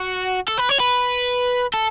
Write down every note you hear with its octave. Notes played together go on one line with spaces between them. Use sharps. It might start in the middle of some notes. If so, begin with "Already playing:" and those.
Already playing: F#4
A4
B4
C#5
B4
A4